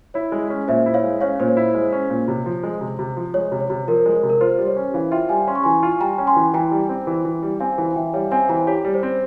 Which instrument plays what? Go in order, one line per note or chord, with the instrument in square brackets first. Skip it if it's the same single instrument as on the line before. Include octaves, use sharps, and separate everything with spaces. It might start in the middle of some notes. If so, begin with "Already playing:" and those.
[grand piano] E4 [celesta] C#5
[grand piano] G#3
C#4
[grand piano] A#2 [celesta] C5 E5
[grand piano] E4
[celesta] C#5 F5
[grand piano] G#3
[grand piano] C#4 [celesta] C#5 F5
[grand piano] A#2 [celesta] C5
[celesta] C#5
[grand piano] E4
[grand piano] G#3 [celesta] C5
[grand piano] C#4
A#2
[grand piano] C3 [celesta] C#5
[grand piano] F3
G#3
C3
C3
F3
[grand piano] G#3 [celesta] C#5
[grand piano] C3
[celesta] C#5
[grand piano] C3
[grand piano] F3 [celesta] A#4
[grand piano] G#3
C3
[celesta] A#4
[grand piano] F4 [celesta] C5
[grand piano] G3
[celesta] C#5
[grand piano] C#4
[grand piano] E3 [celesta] C#5 F5
[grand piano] F4 [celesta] E5 G5
[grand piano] G3 [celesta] F5 G#5
[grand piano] C#4 [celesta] C6
[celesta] C#6
[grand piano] E3 [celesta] G#5 C6
[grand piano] F4
[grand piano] G3 [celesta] G5 A#5
[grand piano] C#4
[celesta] G#5 C6
[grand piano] E3
[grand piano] E3 [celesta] G5 A#5
[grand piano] G3
C4
E3
E3
G3
[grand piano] C4 [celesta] F5 G#5
[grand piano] E3 [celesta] F5 G#5
[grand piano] E3 [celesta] E5 G5
[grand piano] G3 [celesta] C#5 F5
[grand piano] C4 [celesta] F5 G#5
[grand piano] E3 [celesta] G5 A#5
[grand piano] G4 [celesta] C#5
[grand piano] G3
[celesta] C5
[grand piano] C4